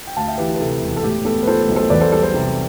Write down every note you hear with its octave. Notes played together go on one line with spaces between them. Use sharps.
G5
D2 F5 A5
E5 G5
E3 G4 B4
G4
B4
C3 A4
E1
A4
A2 G4
B3 A4
B4
F3 A4 C5
B1
A4 C5
E2 B4 D5
A4 C5
G3 A4
A4 C5
C3